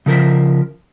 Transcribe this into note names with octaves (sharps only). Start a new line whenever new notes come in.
C#3 F3 A#4 C5 E5